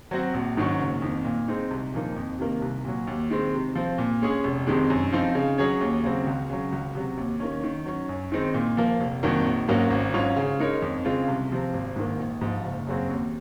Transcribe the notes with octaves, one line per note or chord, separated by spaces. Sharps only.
F#3 C4 F#4
A#1
G#2 D#3 F#3 C#4
F#1
F2 D#3
A#2
G#3 C4 D#4
C2
A#2 F3 A#3 D#4
F2
C3 D#3 A#3
C2
A#2 F#3
D#2
D#3 G#3 C4
C3
F3 C4
A#2
G#3 C#4 G#4
F1
F2 C3 D#3 G#3
F#2
F3 C4 D#4
C#3
F#3 C#4 G#4 C#5
D#2
C#3 F#3 C4
C#2
C#3 F#3
C#2
C3 F#3
D#2
D#3 A#3 C#4
D#3
F#3 C#4
F#2
D#3 G#3 C4 D#4
A#2
F3 A#3
F1
F2 D#3 F#3 A#3
A#1
G#2 F#3 A#3 C#4
G#1
G#2 F#3 C#4 F4
C#3
G#3 D#4 A#4 C#5
F2
C#3 G#3 C4 F4
C2
C3 F3 C4
G#1
G#2 D#3 A#3
A#1
G#2 F3
F#1
F#2 C#3 F#3 C4
D#2